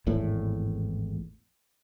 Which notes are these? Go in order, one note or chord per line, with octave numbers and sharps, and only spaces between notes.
G#1 E2 A2